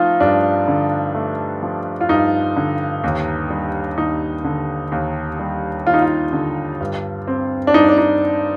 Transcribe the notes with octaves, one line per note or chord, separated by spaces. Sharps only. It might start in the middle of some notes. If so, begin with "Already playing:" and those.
Already playing: F3 A3 D#4 F4
G2 D4
D3
A3
F3
F4
G2 D#4
D3
D#2
G3
D#2 D#4
D3
D#2
G3
D#2 F4
D#4
F4
D3
G2
C4
D4
G2 D#4
D4
D#4